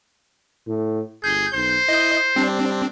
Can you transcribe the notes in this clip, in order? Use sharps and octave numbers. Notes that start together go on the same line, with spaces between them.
A2
G1 G#4 G6
B1 C5
E4 D#5 G6
G3 C4 D4